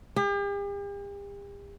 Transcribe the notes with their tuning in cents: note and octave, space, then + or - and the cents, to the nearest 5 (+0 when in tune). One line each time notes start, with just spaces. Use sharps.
G4 +45